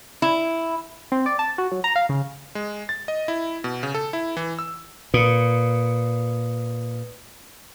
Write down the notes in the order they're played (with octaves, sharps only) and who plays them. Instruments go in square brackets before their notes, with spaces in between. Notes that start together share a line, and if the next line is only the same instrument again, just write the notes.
[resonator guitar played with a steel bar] E4
[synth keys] C4
D5
A5
F#4
F#3
A#5
F5
C#3
[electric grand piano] G#3
A6
D#5
E4
B2
C#3
A4
E4
E3
E6
[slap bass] A#2 [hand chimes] B4 D#6 C#7